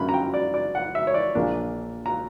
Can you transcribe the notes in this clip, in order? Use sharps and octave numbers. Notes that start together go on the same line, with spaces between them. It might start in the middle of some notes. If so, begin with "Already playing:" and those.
Already playing: F#2 D3 A#3 C#4 E4 B5
A#5
G5
D5
D5
F#5
E5
C#5
D5
A#1 A#2 A#3 D4
A#5